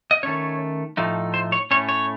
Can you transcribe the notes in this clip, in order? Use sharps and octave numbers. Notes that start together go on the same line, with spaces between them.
D#5
D#3 A3 C#4 C#5
A2 F3 A3 D#4
C5
C#5
A2 A3 C#4 C#5
C#5